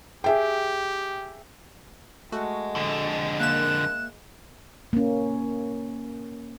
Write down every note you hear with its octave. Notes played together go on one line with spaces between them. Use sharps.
G4 G#4 E5 G5
G#3 A3 F#4 A4
F2 D3
A#3 E5 F#6 E7
A#3 C#4